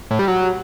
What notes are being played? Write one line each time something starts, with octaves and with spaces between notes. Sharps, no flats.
A2
G3
F#3